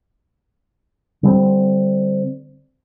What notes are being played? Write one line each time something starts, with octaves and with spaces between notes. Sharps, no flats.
D3 G3 A#3 C4